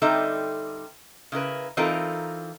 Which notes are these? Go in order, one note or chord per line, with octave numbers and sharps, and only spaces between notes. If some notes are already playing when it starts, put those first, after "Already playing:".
D3 G3 C4 D#4 A4 E5
C#3 E4 A#4 B4
E3 C4 D#4 F4 A4 A#4